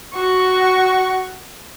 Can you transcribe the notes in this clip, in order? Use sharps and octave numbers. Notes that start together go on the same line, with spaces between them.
F#4 C#6